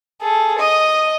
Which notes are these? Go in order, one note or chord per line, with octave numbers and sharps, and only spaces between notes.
G#4 A4
D#5 D#6